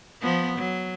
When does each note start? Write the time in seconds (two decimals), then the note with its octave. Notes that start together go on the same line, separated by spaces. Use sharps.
0.21 F3 B3
0.59 F#3